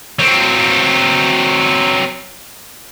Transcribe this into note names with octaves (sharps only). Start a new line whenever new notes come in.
F#3 C4